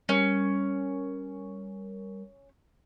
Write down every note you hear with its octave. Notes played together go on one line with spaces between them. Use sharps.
G3 C#4 A#4